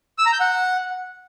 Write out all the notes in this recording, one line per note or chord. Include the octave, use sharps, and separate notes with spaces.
E6
A#5
G6
F#5